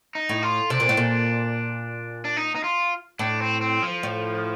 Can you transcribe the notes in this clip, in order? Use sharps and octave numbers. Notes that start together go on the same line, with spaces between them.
D#4
A2
F4
C3 D4
A#2
A2
A#2
D4
D#4
D#4
F4
A2 D4
C4
C4
F3
A2